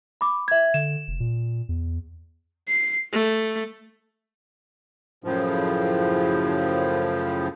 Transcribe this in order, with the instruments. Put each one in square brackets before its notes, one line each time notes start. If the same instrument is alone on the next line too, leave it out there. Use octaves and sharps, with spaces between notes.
[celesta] B5 D6
E5 G#6
[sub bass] D3 [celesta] E7
[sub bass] F1
A#2
E2
[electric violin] C7
A3
[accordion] F#2 A2 C#3 F3